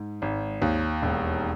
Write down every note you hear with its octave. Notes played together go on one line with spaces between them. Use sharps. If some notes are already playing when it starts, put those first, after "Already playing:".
Already playing: G#2
G#1
D#2
E1